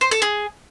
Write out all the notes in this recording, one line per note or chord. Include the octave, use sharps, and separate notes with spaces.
C5
A4
G#4